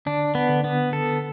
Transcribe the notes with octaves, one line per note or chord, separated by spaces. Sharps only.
D3 D4
B3
D3
B3
A4